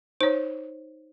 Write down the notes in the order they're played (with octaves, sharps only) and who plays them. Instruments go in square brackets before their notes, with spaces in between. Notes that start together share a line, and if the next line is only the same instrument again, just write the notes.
[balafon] D#4 C#5 [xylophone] C5